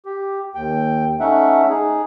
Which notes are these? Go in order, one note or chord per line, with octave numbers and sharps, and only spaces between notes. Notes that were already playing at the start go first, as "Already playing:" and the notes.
G4
D#2 G5
A3 C#4 D#4 E5 F#5
D#4 G#4